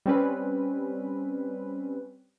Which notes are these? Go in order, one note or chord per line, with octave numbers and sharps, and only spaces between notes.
G3 C4 C#4 B4